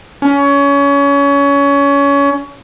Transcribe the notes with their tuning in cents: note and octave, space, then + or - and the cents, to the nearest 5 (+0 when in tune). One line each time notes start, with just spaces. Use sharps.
C#4 +25